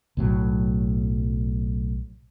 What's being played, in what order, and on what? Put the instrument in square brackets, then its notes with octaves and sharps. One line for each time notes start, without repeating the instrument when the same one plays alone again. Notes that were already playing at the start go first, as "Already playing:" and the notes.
[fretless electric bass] B1 A2 F#3